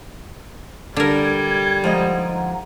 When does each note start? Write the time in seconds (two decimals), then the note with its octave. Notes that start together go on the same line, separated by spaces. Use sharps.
0.97 D3 G3 A#4 G#6
1.84 F3 G#3 D#4 D#5 F#5 A#5